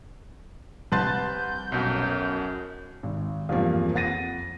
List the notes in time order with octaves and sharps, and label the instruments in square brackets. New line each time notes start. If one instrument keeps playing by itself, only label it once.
[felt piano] C2 F#6 A6 [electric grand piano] B4 A5 C6 [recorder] G6
[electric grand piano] B1 B2 [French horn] F#2
[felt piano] G#1
E2 G2 F3 A#3 C4
F2 F#5 A6 A#6 D#7